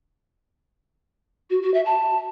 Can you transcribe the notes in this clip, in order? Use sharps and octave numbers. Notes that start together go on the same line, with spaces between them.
F#4
F#4
E5
A5